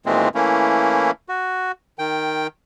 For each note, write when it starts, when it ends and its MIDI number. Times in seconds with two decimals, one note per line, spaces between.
0.06 0.29 39
0.06 0.29 46
0.06 0.29 52
0.06 0.29 56
0.06 0.29 57
0.06 0.29 60
0.35 1.11 52
0.35 1.11 57
0.35 1.11 58
0.35 1.11 61
0.35 1.11 64
1.29 1.72 66
1.99 2.47 51
1.99 2.47 79